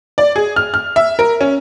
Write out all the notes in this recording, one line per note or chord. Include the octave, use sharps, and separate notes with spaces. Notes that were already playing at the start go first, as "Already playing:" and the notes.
D5
G#4
F6
F6
E5
A#4
C#4